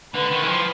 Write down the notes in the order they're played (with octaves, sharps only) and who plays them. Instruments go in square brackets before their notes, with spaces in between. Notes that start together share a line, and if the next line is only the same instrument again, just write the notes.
[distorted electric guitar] D3 [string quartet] B4
[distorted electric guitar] D#3
E3
F3